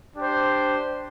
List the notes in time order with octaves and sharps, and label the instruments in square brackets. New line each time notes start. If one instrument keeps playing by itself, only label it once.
[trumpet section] D4 G4 C5